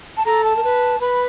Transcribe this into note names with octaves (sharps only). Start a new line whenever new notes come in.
A5
A4 A#5
A5
A#4
B4
B4 B5